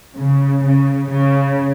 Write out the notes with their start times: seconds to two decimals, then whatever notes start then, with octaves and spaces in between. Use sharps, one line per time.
0.15 C#3
0.63 C#3
1.11 C#3